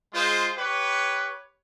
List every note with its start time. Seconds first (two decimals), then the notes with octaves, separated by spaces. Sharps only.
0.14 G#3 F4 G#4 C5
0.58 G4 B4 C#5